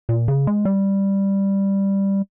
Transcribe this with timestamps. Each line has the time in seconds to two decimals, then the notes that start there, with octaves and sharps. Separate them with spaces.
0.09 A#2
0.28 C#3
0.47 G#3
0.65 G3